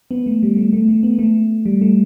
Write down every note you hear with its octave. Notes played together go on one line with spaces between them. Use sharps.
B3
A3
G3
A3
A3
A3
B3
A3
G3
A3